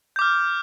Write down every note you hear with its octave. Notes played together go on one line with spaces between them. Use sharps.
D6 F6 G6